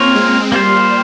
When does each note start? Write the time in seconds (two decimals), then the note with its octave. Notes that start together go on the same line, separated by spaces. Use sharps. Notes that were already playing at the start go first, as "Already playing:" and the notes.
Already playing: A#3 C4 C#4 F4 A#4 C#5
0.15 G#3
0.52 G3 A#3 F4 C5